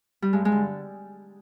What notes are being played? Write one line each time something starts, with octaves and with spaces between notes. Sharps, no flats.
G3
G2 G#3
G#3
D3